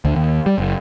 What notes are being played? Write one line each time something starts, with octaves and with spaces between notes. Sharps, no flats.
D2
D#2
G3
F#1